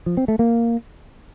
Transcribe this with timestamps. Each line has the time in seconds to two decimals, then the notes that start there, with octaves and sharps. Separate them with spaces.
0.06 F3
0.17 C4
0.28 A3
0.39 A#3